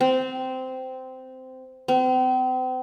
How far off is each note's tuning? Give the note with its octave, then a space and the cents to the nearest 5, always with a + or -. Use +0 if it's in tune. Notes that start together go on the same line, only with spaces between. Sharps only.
C4 -15
C4 -40